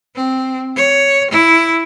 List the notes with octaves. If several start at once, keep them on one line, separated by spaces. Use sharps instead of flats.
C4
C#5
E4